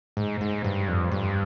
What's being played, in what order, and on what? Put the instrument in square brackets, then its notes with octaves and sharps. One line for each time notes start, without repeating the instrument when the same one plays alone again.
[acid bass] G#2
G#2
G2
F2
G2